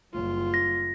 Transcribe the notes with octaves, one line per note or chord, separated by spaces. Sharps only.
F#1 G3 F4
A#6